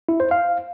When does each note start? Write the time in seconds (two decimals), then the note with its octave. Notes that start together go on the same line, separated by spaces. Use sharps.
0.09 E4
0.20 C5
0.31 F5